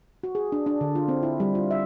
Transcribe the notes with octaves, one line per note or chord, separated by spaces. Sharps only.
F#4
G#4
D4
D4
D3
F4
C4
E4
G3
F4
E5